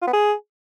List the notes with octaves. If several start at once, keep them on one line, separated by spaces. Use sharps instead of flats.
F4
B3
G#4